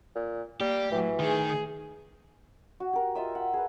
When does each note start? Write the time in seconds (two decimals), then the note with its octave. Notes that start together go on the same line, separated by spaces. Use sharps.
0.15 A#2
0.60 G3 A#3 G4
0.91 A2 E3 F#3
1.20 D#3 G#4
2.80 F#4
2.93 G4 A#4
3.15 F4 D#5 E5 E6
3.35 F#5
3.54 G#4 B4